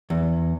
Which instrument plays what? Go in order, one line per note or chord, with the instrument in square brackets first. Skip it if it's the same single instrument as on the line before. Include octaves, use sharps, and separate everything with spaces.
[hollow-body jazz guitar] E2